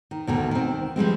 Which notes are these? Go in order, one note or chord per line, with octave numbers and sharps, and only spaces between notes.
D#3
D2 B2 D#3
D#3 C4
F3 G3 G#3 C4